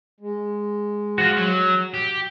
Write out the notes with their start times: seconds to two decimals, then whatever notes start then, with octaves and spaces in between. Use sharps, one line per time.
0.20 G#3
1.18 F3 F4 F#4
1.37 F#3
1.94 G4